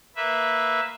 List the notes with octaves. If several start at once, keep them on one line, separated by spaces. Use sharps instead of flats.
A#3 B4 E5